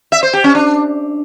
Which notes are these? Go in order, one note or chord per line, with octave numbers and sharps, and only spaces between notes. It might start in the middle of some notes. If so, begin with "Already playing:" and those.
E5
C5
G4
C#4
D4